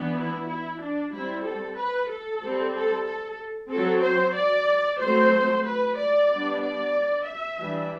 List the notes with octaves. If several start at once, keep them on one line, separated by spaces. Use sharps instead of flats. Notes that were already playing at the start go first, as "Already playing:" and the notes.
Already playing: E3 B3 D4
E4
E4
D4
G3 C4 E4
A4
B4
A4
G3 C4
A4
A4
F#3 C4 A4
C5
D5
F#3 A3 C4 C5
B4
D5
G3 B3 D4
D5
E5
E3 G3 D4